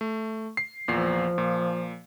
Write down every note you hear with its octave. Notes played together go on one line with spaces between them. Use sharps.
A3
C7
E2 A#2 F3 C7
A#2